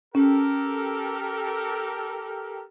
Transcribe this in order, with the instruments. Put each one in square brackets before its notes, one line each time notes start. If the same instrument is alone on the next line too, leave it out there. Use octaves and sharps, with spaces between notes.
[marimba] C#4 [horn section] G4 A4 A#4